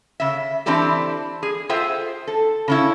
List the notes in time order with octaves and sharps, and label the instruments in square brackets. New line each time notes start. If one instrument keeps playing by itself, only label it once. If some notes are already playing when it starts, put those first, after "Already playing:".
[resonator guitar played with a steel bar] C#3 E5
E3 C4 D4 E4 G4 A4
G#4
F4 G#4 A4 C5 E5 G5
A4
C#3 C#4 E4